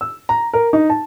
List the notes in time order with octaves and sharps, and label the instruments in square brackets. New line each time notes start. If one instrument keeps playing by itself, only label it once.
[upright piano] E6
A#5
A#4
D#4
A5